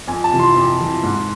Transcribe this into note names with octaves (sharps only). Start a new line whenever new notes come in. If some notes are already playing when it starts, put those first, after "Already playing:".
F2 G#5
A5
C3 E3
C6
F2
C3 E3
G#2